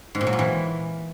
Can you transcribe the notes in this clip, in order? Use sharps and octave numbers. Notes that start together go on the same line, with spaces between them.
G#2
A#2
F#3
A#2
E3